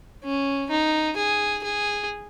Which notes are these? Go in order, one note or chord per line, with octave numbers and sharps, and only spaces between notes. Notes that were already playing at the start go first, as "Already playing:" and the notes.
C#4
D#4
G#4
G#4